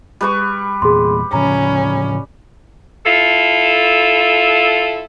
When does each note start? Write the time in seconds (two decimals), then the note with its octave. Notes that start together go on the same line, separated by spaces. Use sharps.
0.21 G3 B4 C#6
0.82 E2 A#2 G#4 C6
1.33 A2 C#3 F3 C#4 A#5
3.06 E4 F4 A4